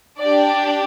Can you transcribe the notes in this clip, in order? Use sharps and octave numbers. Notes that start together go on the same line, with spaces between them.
D4 G4 D5